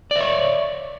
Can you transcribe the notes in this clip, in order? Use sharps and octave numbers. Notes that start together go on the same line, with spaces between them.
C#5 D5 E5